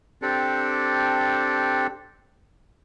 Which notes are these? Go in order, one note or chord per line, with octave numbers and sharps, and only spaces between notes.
C4 D4 G4 A4